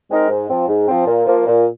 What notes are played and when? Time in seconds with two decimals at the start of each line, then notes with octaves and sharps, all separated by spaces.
0.09 G#3 C4 D#4 A#4
0.29 G#2
0.49 F3 C4
0.68 G#2
0.88 F3 C4
1.07 A#2
1.26 F3 A#3
1.46 A#2